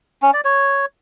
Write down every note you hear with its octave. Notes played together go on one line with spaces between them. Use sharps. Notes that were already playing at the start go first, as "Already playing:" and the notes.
C#4
D5
C#5